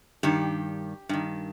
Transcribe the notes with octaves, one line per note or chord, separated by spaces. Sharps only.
G2 D#3 G4
G2 D#3